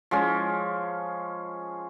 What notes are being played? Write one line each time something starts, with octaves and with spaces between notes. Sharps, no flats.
F3 G#3 C#4